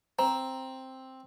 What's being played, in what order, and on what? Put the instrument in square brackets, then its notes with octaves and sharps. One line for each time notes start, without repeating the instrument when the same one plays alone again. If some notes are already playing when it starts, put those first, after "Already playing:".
[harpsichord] C4 [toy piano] A#5